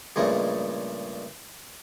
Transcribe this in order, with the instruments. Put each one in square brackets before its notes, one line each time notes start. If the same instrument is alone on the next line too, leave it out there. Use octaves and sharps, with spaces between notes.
[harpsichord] G2 A#2 C#3 F3 G#3 A3